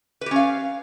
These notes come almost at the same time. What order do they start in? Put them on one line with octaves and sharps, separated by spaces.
B4 G4 C#4 F5